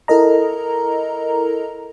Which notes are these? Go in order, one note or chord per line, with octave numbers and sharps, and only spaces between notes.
E4 A4 A#4 D#5 A#5